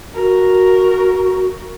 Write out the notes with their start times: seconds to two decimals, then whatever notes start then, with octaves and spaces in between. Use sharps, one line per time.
0.14 F#4 A#4